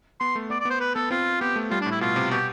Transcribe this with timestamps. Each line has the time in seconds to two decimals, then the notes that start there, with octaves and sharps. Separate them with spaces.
0.20 B3 C6
0.35 A3
0.50 B3 D5
0.60 D5
0.65 B3
0.70 C5
0.81 B4
0.95 B3 A4
1.10 C4 F4
1.41 B3 G4
1.56 A3
1.71 G3 F4
1.81 A2 D4
1.92 E4
2.01 B2 F4
2.16 C3
2.31 B2 G4